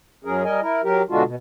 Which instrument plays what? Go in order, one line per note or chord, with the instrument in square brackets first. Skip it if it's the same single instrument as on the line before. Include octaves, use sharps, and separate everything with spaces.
[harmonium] F#2 F#3 C#4 G#4 A#4
G3 A#4 D#5 G#5
E4 A#4
F#3 G4 A#4
B2 D3 G#3 D4 F4 F#4
B2